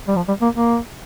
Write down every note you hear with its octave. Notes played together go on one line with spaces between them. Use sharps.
G3
F3
G3
A#3
A#3